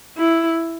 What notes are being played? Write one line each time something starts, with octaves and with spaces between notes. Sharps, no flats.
E4